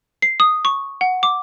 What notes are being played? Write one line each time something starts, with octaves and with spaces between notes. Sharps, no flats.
C7
D#6
C#6
F#5
D6